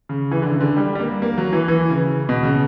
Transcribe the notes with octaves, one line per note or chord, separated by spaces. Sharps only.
C#3
E3
D3
C#3
D3
G3
G3
A#3
A#3
F#3
E3
E3
C#3
B2
C#3